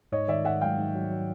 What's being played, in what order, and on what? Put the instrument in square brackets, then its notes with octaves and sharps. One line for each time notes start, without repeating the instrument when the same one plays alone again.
[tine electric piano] G#2 [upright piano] C#5 D#5
[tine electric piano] D#3 [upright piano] D5 E5
[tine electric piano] D#3 [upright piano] E5 F#5
[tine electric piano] F#3 [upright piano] F5 G5
[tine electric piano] G#2
F#3
F#3